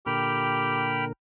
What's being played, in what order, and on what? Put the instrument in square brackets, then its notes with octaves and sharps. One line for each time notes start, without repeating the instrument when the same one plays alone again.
[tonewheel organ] A#2 D3 A#4 [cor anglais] G4 [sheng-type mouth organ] G5 B5 F6